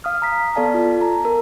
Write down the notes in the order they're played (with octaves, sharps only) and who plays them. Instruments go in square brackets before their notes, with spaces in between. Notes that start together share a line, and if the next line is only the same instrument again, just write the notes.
[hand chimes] F5 D#6 F6
A#5 B6
B3 A4 D5 F5 A5
F4
A#5
A#4